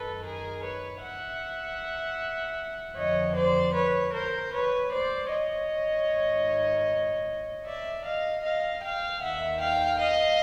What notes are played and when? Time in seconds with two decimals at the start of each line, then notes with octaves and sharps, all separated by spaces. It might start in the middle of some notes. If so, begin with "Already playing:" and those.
Already playing: F#2 D#3 A4 B4
0.23 G#4 A#4
0.63 B4 C#5
1.02 E5 F#5
2.97 F2 D3 F3 C#5 D#5
3.36 C5 D5
3.75 B4 C#5
4.14 A#4 C5
4.53 B4 C#5
4.92 C5 D5
5.31 C#5 D#5
6.10 G#2 D#3
7.66 D5 E5
8.05 D#5 F5
8.43 D#5 F5
8.83 F5 G5
9.21 D#2 D#3 E5 F#5
9.61 F5 G5
10.00 D#5 F5